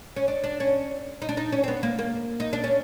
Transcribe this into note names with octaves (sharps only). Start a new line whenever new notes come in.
C#4
D4
D4
C#4
D#4
D4
D#4
C#4
C4
B3
A#3
A#3
D#4
D4
C#4